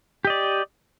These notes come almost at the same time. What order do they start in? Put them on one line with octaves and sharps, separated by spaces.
G4 D#5 D5